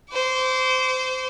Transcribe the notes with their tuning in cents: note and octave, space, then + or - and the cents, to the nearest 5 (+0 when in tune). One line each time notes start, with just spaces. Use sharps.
C5 -20 D6 -40